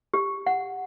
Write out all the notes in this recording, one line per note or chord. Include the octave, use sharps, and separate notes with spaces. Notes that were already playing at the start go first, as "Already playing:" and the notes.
G4
F#5